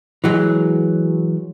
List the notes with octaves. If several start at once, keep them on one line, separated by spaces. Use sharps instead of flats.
E3 F#3 G#3